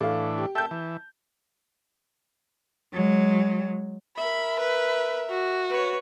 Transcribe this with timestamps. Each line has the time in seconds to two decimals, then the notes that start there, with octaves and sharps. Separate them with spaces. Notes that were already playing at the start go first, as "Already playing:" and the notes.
0.01 A2 E3 D4 A4 F5
0.38 G4
0.55 A4 E5 G5 A5 G6
0.71 E3
2.94 F#3 G#3
4.18 A#4 E5 B5
4.60 B4
5.30 F#4
5.69 B4 C#5